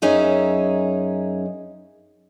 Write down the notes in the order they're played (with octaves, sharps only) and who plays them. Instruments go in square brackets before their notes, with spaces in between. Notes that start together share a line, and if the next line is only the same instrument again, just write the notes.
[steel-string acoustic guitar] F#2 C#4 D#4 G#4 E5